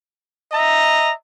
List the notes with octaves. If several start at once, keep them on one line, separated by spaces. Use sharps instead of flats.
D#5 E5 A#5